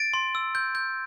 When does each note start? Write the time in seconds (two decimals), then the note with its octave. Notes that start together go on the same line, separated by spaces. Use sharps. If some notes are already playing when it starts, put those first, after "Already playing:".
Already playing: A6 D7
0.14 C6
0.35 E6
0.55 G6
0.75 G6